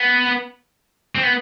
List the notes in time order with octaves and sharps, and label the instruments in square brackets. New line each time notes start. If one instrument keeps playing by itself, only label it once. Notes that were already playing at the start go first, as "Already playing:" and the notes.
Already playing: [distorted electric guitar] B3
C4
B3